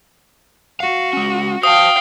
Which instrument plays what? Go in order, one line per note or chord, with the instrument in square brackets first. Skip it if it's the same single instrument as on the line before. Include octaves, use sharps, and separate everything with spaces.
[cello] F#4 [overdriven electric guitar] F5
[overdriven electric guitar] G#3 C#4
[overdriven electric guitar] C5 A5 [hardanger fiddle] F5 G5 [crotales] D#6